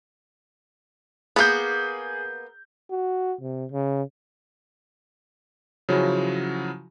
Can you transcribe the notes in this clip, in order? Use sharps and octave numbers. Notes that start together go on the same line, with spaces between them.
A#3 B3 G#4 G6
F#4
C3
C#3
C#3 F3 F#3 C#4 E4 F#4